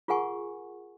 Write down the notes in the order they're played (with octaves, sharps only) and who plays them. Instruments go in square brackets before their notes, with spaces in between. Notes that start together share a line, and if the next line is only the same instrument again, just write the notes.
[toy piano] F4 G#4 A#4 F#5 G#5 C#6